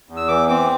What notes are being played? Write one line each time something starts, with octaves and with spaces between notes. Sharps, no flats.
E2
E6
E3 D6
C4 D6